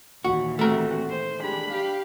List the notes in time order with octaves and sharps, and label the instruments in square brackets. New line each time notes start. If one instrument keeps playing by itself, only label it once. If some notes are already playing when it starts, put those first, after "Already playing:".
[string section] D#2 A#2 E3 [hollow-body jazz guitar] F#4
[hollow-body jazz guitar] A3 A#4 [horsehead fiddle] C4 F#4
[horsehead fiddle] C5
[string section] G#3 G4 [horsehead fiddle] D4 B5
[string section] G4 F5